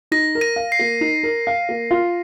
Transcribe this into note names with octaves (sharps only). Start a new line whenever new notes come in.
D#4 A#6
A#4
A#6 D#7
F5
C7
A#3
D#4
A#4
F5
A#3
F4